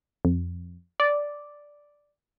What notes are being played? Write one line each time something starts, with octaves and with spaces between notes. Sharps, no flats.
F2
D5